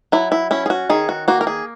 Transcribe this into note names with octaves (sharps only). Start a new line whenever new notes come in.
F#3 E4
E4
C#4 E4
G#4
F#4
D#3 G#4
F#4
A#3 F#4
A#4
G#4